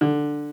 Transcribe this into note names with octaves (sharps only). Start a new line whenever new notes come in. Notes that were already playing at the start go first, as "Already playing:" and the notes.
D3